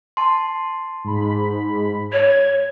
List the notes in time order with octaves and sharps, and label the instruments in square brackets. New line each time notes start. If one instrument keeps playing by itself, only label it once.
[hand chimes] A5 C6
[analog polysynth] G#2 B5
[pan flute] C#5 [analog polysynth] G#6